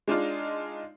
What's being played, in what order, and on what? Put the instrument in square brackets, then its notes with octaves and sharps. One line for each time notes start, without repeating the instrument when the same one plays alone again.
[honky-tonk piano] G#3 D4 D#4 F4